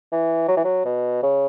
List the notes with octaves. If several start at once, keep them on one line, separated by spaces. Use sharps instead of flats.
E3
F#3
E3
F#3
B2
C#3